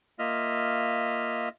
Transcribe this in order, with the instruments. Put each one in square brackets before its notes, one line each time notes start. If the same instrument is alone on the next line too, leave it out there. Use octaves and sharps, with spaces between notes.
[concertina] A#3 F4 D#5 E5 F6